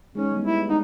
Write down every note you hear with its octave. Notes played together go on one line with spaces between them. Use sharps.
G#3 C#4 D#4 C#5
G3 A3 B3
E4
G#3 D4 D#4 F#5